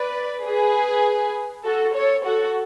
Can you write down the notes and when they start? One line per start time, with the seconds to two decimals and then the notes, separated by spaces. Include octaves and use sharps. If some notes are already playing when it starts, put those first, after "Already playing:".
Already playing: B4 D5
0.44 G#4 B4
1.64 F#4 A4
1.94 A4 C#5
2.25 F#4 A4